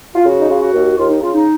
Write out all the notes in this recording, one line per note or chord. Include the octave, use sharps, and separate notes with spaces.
F4
C#3 F#4
D#4
C#3 F4
F#4
D#2
D#2 F4
D#4
C#3 F4
D#4